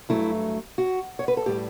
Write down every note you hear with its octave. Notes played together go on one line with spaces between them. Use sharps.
G2 F#3 A3 E4
F#4
C#5
B4
A4
A2 G3 G4